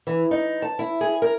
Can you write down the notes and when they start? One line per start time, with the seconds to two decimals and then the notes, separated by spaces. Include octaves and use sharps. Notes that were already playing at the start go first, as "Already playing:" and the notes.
0.07 E3
0.31 D#4
0.62 A5
0.79 E4
1.01 G#4
1.22 A#4